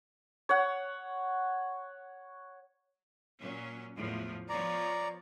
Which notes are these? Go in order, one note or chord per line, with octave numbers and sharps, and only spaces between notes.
C#5 F#5
A#2 F#3 C#4
E2 A2 F3
F3 B3 C#5 D5 A#5